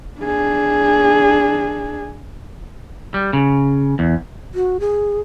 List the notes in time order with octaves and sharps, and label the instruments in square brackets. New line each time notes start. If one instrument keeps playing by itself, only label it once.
[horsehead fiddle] D4 G#4
[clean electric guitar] G3
C#3
E2
[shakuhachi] F#4
G#4